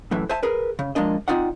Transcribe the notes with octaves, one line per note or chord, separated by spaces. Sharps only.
F#2 A2 E3
C5 E5 G#5 A5
G#4 A#4 B4
C#3
F3 G#3 A#3 D4 D#5
C4 C#4 D#4 F4 D5 F#5